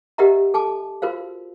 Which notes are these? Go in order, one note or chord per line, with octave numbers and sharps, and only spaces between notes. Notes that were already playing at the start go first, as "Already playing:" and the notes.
G4 A#4 D#5 E5 F#5 A#5
A4 G#5 A5 D6
F4 F#4 A#4 C5 F5